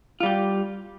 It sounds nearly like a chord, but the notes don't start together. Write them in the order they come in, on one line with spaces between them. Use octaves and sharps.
F4 G3 G4